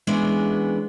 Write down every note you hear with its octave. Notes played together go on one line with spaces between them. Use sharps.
E3 G#3 B3 C#4 D4